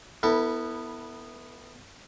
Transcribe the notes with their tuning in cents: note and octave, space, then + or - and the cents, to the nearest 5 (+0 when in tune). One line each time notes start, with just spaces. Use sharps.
B3 +0 E4 -15 A4 +35